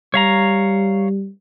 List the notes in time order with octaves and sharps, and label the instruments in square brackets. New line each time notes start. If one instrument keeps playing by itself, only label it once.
[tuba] G3 [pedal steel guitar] C#5 F5 A#5